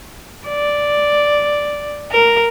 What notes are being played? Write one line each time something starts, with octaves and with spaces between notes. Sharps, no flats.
D5
A#4